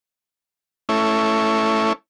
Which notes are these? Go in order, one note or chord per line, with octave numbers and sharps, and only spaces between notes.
A3 C#4 E4